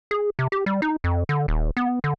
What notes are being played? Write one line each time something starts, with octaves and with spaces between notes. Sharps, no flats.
G#4
C3
G4
G3
D#4
F2
D3
D#1
B3
D3